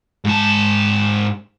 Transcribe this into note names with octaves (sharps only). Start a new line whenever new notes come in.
G#2 A5